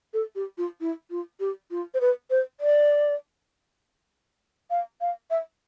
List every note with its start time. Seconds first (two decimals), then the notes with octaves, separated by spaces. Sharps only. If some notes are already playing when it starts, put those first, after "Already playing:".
0.14 A4
0.35 G4
0.58 F4
0.81 E4
1.11 F4
1.40 G4
1.71 F4
1.94 C5
2.01 B4
2.30 C5
2.60 D5
4.70 F5
5.01 F5
5.30 E5